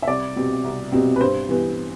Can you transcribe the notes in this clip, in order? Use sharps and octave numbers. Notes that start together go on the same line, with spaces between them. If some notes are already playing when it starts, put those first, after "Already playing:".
E5
C2 D5
B2 G3 C4
C2
B2 G3 C4
B4
G2 C5
E3 G3 B3